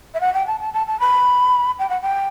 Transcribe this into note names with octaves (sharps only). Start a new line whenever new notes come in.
E5
F#5
G5
A5
A5
A5
A5
B5
G5
F#5
G5